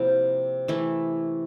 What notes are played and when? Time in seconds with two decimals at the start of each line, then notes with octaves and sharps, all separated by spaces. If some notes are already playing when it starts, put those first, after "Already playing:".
Already playing: C3 F3 A#3 E4
0.68 E3 A3 E4